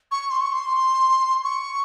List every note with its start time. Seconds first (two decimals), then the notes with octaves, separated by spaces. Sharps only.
0.12 C#6
0.30 C6
0.41 C#6
0.52 C6
1.44 C#6